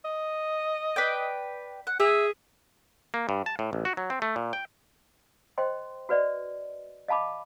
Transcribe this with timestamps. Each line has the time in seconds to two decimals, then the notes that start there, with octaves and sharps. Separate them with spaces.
0.05 D#5
0.96 B4 D5 G5
1.87 F#5
2.00 G#4 E5
3.14 A#3
3.29 G2
3.46 A5
3.59 A2
3.73 A1
3.85 F#4
3.97 F#3
4.10 C4
4.22 A3
4.36 A#2
4.53 G5
5.58 C5 D#5 G5 C6
6.09 F#4 B4 D5 D#5
7.08 D#5 F5 A5 B5 D6